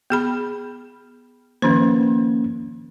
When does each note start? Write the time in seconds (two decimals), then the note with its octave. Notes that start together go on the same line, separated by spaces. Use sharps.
0.10 B3 G#4 B5
1.62 D#3 F3 A#3 C#4 C5